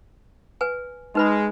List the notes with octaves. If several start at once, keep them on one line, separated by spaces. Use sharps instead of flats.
B4 G#5
G#3 D#4 B4 B5